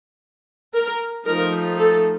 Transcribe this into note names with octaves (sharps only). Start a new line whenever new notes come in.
A#4
F3 A3 D#4 A#4
A4